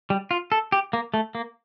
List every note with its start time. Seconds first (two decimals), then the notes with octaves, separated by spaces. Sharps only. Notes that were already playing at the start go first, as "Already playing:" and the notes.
0.10 G3
0.31 F4
0.52 A4
0.72 G4
0.93 A#3
1.14 A3
1.35 A#3